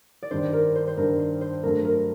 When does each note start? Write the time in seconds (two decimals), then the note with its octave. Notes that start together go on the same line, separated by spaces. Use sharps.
0.23 D5
0.31 G2 D#3 G3 D4 C5
0.53 A#4
0.76 C5
0.88 C5
0.97 G2 D#3 G3 D4 A#4
1.19 C5
1.41 C5
1.63 G2 F#3 A3 A#4
1.85 A#4